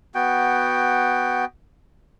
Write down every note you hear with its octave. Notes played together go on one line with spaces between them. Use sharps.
B3 F#4 G5